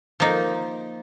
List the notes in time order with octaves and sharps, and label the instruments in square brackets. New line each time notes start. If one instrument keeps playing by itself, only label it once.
[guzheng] F3 A#3 D#4